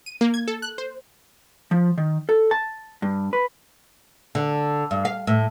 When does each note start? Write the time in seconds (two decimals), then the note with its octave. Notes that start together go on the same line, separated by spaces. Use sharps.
0.06 D#7
0.21 A#3
0.34 G#6
0.48 A4
0.62 F#6
0.78 C5
1.71 F3
1.98 D#3
2.29 A4
2.51 A5
3.02 G2
3.33 B4
4.35 D3
4.91 G2
5.05 F5
5.27 A2